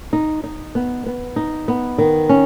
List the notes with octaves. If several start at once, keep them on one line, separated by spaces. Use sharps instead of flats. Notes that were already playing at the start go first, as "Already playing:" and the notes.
D#4
D#4
B3
B3
D#4
B3
D#3
C#4